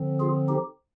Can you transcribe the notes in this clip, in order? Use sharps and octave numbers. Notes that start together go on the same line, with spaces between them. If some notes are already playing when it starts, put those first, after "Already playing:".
Already playing: D3 F3 C4
F4 G#4
D#4 G4